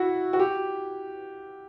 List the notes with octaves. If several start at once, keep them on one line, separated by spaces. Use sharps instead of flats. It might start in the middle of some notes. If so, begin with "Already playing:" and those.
Already playing: E4 F#4
F#4
G4